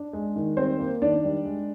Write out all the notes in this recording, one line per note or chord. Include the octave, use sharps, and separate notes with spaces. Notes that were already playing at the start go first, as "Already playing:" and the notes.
Already playing: D4
G#3
D#3
G3 C4 C5
A#3
D#3 D4 D5
G3
G#3